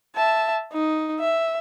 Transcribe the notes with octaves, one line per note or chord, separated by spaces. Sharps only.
E5 A5
D#4
E5